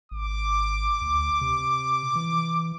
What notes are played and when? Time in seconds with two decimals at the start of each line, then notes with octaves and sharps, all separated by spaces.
0.11 G#1 D6
1.01 D2
1.41 C3
2.16 E3